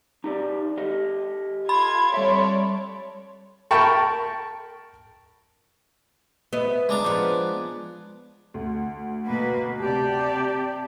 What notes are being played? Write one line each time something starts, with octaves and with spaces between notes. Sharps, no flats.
D#4 G4 D5
G4 A4 D#5
F4 A4 B5 C6 G#6
G3 A4 C#5 D5 E5
A#4 G5 A5 B5 C#6
B3 D#5 E5
G#3 D4 A#5
F3 B3
D2
B2 A#3 B4
C3 G4 D5 A5